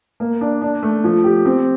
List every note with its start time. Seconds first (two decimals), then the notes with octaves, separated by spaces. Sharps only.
0.20 A#3
0.41 D4
0.62 D4
0.83 A3
1.04 F3
1.24 G4
1.45 C4